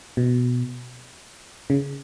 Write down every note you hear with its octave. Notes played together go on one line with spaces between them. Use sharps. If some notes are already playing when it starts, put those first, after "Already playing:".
B2
C#3